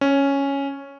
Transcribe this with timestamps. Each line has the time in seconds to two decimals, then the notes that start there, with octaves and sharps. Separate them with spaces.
0.01 C#4